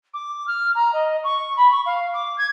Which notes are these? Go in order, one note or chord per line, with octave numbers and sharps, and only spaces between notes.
D6
F6
A#5
D#5
C#6
B5
C#6
F5
D6
G#6